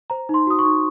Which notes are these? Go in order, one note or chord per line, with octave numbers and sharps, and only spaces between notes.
C5 A#5
D#4
C6
F#4 D#6
C#6
D#4